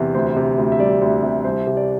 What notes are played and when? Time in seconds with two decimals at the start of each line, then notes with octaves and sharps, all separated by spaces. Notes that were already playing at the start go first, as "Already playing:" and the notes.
Already playing: E2 C3
0.14 D2 C5
0.36 C3
0.58 D2
0.72 E5
0.79 G3 D5
1.01 D2
1.23 C3
1.44 C2 C5
1.67 C3
1.77 D5